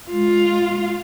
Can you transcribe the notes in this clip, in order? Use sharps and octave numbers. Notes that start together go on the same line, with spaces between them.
G#3 F4